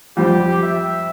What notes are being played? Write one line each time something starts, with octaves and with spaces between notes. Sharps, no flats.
F2 G3 G4 C5
E5